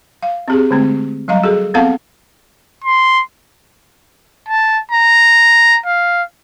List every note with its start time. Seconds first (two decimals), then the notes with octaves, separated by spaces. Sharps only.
0.23 F5
0.48 C4 G4 G#4
0.71 D3 G#3 A3 C4
1.28 F#3 G3 D#5 F5 A#5
1.44 F#4 G#4 A4
1.74 B3 C4 A4 F5 F#5 A5
2.84 C6
4.48 A5
4.91 A#5
5.86 F5